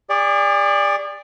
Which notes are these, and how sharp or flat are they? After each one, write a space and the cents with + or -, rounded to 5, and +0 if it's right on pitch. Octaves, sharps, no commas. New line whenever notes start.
G#4 -40 D5 +0 C#6 -20